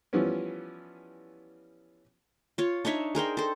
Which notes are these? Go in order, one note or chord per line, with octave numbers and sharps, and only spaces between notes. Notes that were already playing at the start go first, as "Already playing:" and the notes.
E3 F3 G3 B3 C#4
F4 C#5
D4 D#4 C#5 E5
G#4 A#4 C5 G5
A4 C5